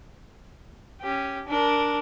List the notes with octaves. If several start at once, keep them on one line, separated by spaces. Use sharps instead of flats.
C#4 G4
D4 A#4